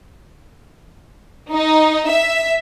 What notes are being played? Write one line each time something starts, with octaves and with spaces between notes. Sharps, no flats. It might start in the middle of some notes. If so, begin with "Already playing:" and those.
D#4
E5